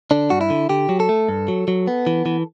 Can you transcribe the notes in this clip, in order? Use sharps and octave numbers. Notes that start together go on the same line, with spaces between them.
D3 D4
G2 F#4
E4
D3
D3 G4
F#3
A4
A3
G2
F#3
F#3
B3
E3
E3